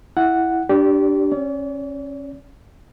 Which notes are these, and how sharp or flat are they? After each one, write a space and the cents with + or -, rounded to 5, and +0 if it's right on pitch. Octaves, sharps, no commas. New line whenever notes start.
E4 +0 F#5 +0
D4 +0 G4 -15 D5 -35
C#4 -20 D5 -45